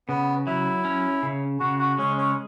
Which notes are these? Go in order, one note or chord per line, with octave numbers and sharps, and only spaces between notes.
C#3 B3
F#3 E4
C#4
C#3
C#3 F#4
F#4
G#3 C#4
C#4